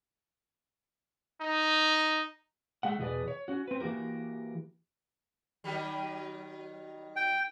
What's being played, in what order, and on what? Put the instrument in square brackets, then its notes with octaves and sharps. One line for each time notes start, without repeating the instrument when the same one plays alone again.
[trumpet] D#4
[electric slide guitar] G#3 A3 F#5
E2 B2 G#4 B4 D5
C#5
C#4 F#4
C4 B4
E3 A#3 F#4 G4 A#4
[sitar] D#3 F#3 G3
[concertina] G5